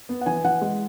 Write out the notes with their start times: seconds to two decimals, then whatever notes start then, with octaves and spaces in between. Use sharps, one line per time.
0.09 B3
0.21 F#5
0.26 E3 G#5
0.44 E3 F#5
0.61 G#3